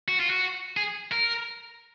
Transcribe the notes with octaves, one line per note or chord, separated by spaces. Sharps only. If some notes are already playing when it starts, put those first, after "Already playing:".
F#4
F4
F#4
G#4
A#4